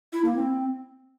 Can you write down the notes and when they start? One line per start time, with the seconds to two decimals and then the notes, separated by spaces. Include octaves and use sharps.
0.13 E4
0.25 A#3
0.36 C4